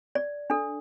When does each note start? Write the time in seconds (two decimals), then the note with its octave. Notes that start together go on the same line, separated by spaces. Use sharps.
0.15 D5
0.50 D4 A4